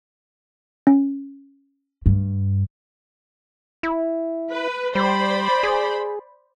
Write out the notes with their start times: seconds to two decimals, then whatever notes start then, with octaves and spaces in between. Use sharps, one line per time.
0.87 C#4
2.06 G2
3.83 E4
4.50 B4
4.95 G3 C5 D5 B5
5.63 G#4